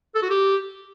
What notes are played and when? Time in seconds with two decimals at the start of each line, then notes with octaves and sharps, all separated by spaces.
0.15 A4
0.23 F#4
0.30 G4